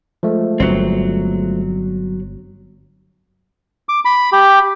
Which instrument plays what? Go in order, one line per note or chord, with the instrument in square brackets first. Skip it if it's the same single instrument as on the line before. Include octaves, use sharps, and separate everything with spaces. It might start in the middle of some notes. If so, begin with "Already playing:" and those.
[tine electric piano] F3 G#3 A3
[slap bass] G1 [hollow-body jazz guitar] F#3 C4
[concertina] D6
B5
G4